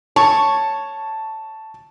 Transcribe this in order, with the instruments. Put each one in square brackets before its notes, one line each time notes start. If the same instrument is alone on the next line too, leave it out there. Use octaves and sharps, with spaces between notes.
[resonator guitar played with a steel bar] C#5 [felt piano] A5 C#6